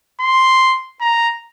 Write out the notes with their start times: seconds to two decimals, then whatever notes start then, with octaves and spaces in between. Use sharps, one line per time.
0.20 C6
1.01 A#5